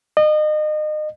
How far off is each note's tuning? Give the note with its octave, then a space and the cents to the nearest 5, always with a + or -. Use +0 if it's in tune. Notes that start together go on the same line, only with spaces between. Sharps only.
D#5 -30